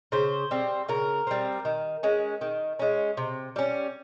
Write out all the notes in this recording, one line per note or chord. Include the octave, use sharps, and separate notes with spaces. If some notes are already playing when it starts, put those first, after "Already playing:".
C#3 C5
G3 C4
C#3 A#4
G3 C4
D#3
G#3 C#4
D#3
G#3 C#4
C3
G3 C#4